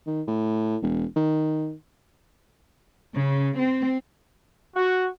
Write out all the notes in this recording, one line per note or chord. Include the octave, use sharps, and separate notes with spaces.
D#3
A2
E1
D#3
C#3
C4
F#4